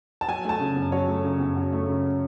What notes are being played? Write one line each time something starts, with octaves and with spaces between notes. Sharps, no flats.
A5
F#3 G#5
A3 A5
C#3
F#2
F#3 C#5
A3
C#3
F#2
F#3
A3
C#3